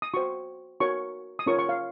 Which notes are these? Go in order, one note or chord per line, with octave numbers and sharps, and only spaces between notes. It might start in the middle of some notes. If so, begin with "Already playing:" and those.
D#6
F#4 C5 C#6
F#4 A#4 C#5 C#6
D#6
C#4 F4 A#4 C#5 C#6
C#6
F5